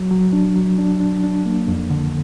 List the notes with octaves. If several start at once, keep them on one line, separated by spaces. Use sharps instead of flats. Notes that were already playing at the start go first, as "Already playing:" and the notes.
Already playing: F#3
F#3
D4
F#3
D4
D4
D4
A#3
F2
D3